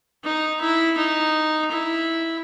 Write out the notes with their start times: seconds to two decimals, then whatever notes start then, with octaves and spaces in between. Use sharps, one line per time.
0.24 D#4
0.61 E4
0.98 D#4
1.71 E4